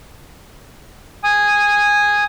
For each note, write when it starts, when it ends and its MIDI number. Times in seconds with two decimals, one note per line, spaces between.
1.24 2.24 80
1.24 2.24 87